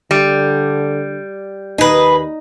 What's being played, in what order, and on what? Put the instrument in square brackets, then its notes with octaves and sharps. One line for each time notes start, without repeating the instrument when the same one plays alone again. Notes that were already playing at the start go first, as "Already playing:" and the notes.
[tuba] D3 [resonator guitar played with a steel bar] G3
[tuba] D#2 [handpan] D#4 D#5 [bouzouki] G#4 B4